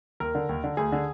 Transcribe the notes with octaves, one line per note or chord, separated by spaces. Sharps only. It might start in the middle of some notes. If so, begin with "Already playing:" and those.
D#2 A#4
D3
D#2
D3
D2 G#4
D3